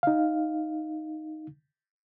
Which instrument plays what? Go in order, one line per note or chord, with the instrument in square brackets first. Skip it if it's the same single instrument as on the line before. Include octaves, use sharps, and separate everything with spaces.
[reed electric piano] D#4 F5